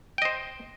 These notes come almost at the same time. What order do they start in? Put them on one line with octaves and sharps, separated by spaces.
G5 D#5 C5